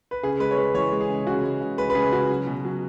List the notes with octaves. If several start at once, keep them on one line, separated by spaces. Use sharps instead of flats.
B4
C#3 G#4
G#3 B4
C#5
G#3 B4
E3 C#5
G#3
G#4
C#3
C#3 F#4
G#3
C#3
G#3 B4
B4
C#3 G#4
C#3 F#4
F#3
B2
F#3